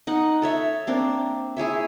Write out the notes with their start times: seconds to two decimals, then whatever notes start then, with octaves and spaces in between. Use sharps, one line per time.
0.07 D#4 F#5
0.42 A4 C#5 E5
0.87 A#3 C4 D4
1.57 E4 G#4 C#5 E5